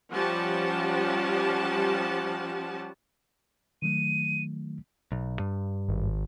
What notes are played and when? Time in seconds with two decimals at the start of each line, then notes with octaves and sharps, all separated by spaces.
0.12 F3 G3 C#4 G4 F#5 A5
3.82 D#3 F#3 A3 D#7
5.12 B1
5.39 G2
5.88 G#1